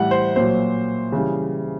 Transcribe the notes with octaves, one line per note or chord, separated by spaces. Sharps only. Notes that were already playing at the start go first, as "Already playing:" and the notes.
Already playing: A2 E3 G3 F#5
C5
A#2 F#3 C5
C#3 E3 G3